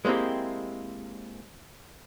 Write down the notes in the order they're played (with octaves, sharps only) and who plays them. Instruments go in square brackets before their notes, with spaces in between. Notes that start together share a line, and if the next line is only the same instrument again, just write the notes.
[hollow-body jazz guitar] G#3 A#3 C4 E4 G4